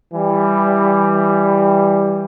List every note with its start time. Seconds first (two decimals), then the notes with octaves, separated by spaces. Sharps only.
0.14 E3 G3